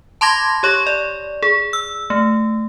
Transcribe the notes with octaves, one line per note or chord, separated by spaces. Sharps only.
A5 B5 C6 D6 G#6 A#6
G4 C#5 C#6
D5
G#4
E6
A3